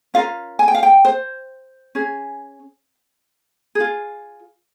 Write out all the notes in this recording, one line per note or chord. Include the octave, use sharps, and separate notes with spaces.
C#4 F4 A#4 F5
G#5
G5
F5
G5
C5
C#4 G#4
G#4
F4